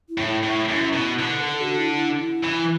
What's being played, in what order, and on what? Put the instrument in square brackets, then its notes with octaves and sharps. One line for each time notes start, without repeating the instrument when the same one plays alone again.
[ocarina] E4
[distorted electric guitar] A2
[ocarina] E4
[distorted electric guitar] A2
F#2
B2
D3
[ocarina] B4
A4
F#4
E4
E4
E4
[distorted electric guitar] E3